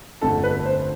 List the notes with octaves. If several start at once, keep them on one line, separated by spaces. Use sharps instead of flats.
G1 F2 D3 A3 A4
B4
C5